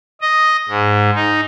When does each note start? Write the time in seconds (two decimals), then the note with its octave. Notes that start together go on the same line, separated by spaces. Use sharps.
0.21 D#5
0.69 G#2
1.15 D#4